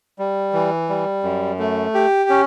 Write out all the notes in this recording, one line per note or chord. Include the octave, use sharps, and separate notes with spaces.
G3
E3
G3
F#2
A3
G4
C#4